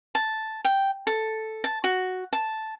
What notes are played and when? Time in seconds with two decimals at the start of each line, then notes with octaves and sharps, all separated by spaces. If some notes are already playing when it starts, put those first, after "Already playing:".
0.15 A5
0.65 G5
1.07 A4
1.64 A5
1.84 F#4
2.33 A5